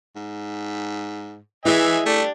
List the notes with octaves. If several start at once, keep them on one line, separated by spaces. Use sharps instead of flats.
G#2
E3 E4 G#4 D#5 E5 G#5
A3 D4 G4